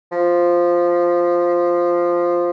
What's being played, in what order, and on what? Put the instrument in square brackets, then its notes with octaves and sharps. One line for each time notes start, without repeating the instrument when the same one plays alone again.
[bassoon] F3